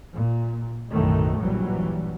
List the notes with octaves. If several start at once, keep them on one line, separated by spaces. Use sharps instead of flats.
A#2
B1 F#2 A2 D#3 E3 A3
A#1 G2 E3 F#3 G3